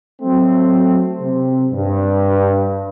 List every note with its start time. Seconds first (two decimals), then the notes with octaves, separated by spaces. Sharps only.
0.22 F#3 A3 C4
1.20 C3 C4
1.71 G2